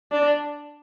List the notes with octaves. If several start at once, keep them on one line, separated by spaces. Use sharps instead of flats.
D4